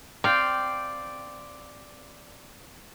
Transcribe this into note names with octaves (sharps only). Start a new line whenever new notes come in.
C4 D5 F5 G5